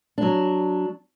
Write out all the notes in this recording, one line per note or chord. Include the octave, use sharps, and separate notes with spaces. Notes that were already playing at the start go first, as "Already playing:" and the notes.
F#3 D4